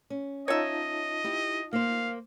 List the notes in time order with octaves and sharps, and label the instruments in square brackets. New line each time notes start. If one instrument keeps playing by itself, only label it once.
[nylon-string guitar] C#4
[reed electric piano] D#4 F4 A5 [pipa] C#5 E5 [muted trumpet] D#5
[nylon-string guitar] E4 G4
[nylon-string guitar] A#3 C5 [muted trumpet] F5